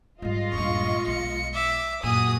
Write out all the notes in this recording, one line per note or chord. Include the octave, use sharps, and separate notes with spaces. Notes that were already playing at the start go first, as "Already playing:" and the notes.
G#2 G3 G#3 F4 D#5
D#1 G2 C#6
B1 C#7
E5 D6
F#2 A#2 F#4 G#4 D#6